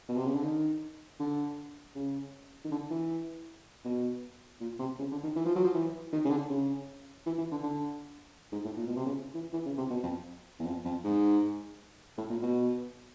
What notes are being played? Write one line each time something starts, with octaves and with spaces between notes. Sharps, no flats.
B2
C3
C#3
D3
D#3
D3
C#3
D#3
D3
E3
B2
A#2
C3
C#3
D3
D#3
E3
F3
F#3
F3
E3
D#3
C#3
D3
C#3
E3
E3
D3
D3
G#2
A2
A#2
B2
C3
C#3
E3
E3
C#3
C3
B2
F2
E2
F2
F2
G#2
A2
A#2
B2